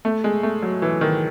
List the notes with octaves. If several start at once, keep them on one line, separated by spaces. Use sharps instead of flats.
A3
G#3
A3
F#3
E3
D#3